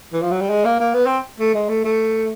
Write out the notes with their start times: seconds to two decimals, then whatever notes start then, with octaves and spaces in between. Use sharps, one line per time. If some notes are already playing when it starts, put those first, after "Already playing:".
0.13 E3
0.22 F3
0.31 F#3
0.41 G3
0.50 G#3
0.65 A#3
0.80 A#3
0.94 B3
1.06 C4
1.40 A3
1.54 G#3
1.69 A3
1.84 A3